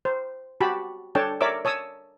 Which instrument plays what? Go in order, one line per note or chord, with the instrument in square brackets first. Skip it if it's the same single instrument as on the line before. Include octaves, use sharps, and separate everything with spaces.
[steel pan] C5
F#4 G4 A5 B5
D4 A4 C#5 G5 A5
A#4 C#5 D5 E5 D6 E6
C#5 A5 D#6 E6